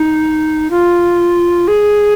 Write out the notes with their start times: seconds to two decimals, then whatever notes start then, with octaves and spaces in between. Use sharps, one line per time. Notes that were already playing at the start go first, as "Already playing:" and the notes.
Already playing: D#4
0.71 F4
1.68 G#4